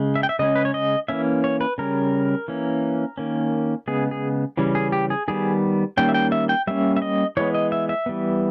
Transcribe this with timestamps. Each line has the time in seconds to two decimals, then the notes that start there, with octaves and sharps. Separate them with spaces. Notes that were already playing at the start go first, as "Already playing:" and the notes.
Already playing: C#3 G#3
0.15 E5
0.23 G5
0.29 E5
0.39 C#3 G#3 C#4 D#5
0.55 B4
0.65 C#5
0.74 D#5
1.08 E3 A#3 C#4 E5
1.44 C#5
1.61 B4
1.78 C#3 G3 C#4 A#4
2.48 E3 A#3 C#4
3.18 D#3 A#3 C#4
3.87 C#3 G#3 B3 G#4
4.11 G#4
4.57 C#3 E3 G3 C#4
4.75 G#4
4.92 G4
5.10 G#4
5.28 D#3 G3 B3 G#4
5.97 D#3 G3 A#3 C#4 G5
6.09 E5
6.14 G5
6.32 E5
6.49 G5
6.67 G3 A#3 C#4 E5
6.97 E5
7.02 D#5
7.37 E3 G#3 B3 C#5
7.55 D#5
7.72 E5
7.89 E5
8.06 E3 G3 B3